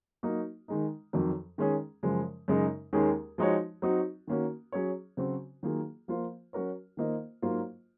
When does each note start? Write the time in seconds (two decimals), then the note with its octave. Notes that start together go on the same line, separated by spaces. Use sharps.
0.23 F#3 A#3 D#4 F#4
0.68 D#3 G#3 D#4
1.13 F2 D#3 F#3
1.58 D#3 G#3 C#4 G#4
2.03 F#2 C#3 F3 G#3
2.48 F#2 C#3 G#3 D#4
2.93 D#2 D#3 G#3 C#4 G#4
3.38 F3 G#3 D#4 F#4 C#5
3.82 F#3 C4 D#4 F#4
4.27 D#3 A#3 C#4 F#4
4.72 F#3 C#4 G#4 C#5
5.17 C#3 F#3 C4 F#4 C5
5.63 D#3 F#3 A#3 F4 G#4
6.08 F3 A#3 F4 C5
6.53 F#3 C#4 F#4 A#4 C#5
6.97 D#3 A#3 F4 C5 D#5
7.42 G#2 F#3 A#3 F4 C5